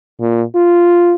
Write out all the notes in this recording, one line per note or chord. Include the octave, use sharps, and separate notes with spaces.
A#2
F4